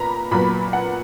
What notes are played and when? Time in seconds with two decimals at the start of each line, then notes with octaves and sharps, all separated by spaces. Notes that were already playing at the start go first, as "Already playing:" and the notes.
Already playing: A#2 B3 A#5 B5
0.31 A#2 F#3 B3 B5
0.73 F#5